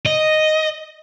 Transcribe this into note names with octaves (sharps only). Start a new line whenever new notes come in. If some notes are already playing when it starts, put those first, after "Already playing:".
D#5